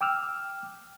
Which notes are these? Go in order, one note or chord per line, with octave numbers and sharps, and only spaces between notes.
G5 D6 E6 F6